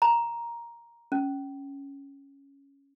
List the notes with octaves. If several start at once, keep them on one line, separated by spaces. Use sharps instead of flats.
A#5
C#4